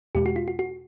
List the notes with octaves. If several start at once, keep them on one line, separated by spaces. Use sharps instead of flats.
E2 B2 G#3 G4
F#4
F4
F#4
F#4